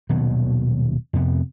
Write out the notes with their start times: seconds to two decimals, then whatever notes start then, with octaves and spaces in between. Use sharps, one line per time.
0.09 D#1 B2 D#3 F#3
1.13 F2 C3 B3